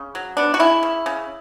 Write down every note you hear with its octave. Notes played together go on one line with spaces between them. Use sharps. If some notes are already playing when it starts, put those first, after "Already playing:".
Already playing: C#3
F#3
B3 D4
F#4
C#3 E4
C#3
C#3